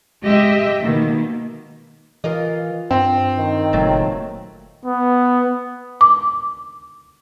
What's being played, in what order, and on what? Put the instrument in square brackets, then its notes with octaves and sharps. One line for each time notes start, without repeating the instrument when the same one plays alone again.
[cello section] G#3 G4 D#5 E5
B2 D#3 A#3
[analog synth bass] E3 [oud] F4 A#4 D#5
[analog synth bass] G2 [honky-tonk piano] C4
[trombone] D#3
[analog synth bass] F#1 [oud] A#2 F#3 A3
[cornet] B3
[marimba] D6